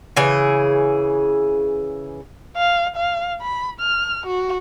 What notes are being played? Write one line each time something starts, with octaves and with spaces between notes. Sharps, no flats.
C#3 E3 G#4
F5
F5
B5
F6
F#4